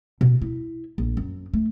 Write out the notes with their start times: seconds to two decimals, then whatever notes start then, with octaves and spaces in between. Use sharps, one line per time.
0.21 B2
0.42 E4
0.98 A#1
1.17 F#2
1.54 A3